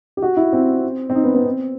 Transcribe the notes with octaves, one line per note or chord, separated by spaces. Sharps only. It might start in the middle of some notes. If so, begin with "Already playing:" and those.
G4
F#4
E4
C4
C4
D#4
B3
B3
C4